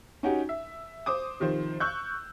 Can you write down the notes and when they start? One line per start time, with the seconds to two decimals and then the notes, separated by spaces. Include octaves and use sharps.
0.23 C#4 D#4 F#4 G4
0.49 E5
1.06 C5 D6 D#6
1.40 C3 D#3 F3 C5
1.80 C#6 E6 F#6 G6